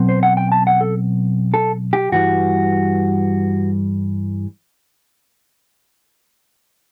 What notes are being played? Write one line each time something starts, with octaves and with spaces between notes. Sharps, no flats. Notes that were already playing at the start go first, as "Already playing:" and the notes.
Already playing: B2 F#3 C4
C5
F#5
G5
A5
F#5
A4
A4
G4
G2 E3 G3 F#4